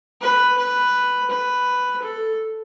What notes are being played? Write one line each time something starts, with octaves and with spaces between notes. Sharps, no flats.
B4
B4
B4
A4